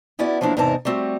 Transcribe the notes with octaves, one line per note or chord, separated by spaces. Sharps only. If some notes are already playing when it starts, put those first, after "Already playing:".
B3 C#4 E4 F#4 D5
F3 F#3 A#3 D4 E4
E2 G#2 C3 D#4 A#4 A5
G3 A3 C4 F#4